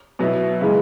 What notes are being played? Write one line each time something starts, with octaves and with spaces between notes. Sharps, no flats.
B2 F#3 B3 E4
C#3 E3 G#3